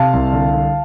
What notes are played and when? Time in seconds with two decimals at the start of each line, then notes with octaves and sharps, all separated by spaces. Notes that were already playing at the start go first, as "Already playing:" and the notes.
Already playing: C3 F5 A5
0.13 C2
0.33 D3
0.53 D3